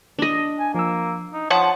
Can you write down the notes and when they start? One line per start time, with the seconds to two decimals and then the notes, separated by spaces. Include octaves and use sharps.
0.19 D4 D#5
0.59 G#5
0.75 F3 A#3 E6
1.33 D#4
1.51 F3 C#5 F#5 A5 D#6